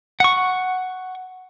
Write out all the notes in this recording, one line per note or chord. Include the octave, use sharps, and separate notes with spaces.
F#5 C#6